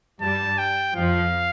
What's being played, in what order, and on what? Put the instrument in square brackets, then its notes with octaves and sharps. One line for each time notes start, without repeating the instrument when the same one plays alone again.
[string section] G2 G3 [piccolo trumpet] A5
[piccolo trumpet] G5
[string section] F2 F3 [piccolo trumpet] F5